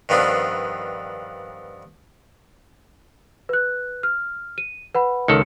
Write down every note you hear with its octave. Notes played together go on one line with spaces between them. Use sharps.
G2 D#3 F3 B3 C4 D4
B4 F#6
F6
D#7
B4 F#5 B5
C#2 D#3 A4 C#7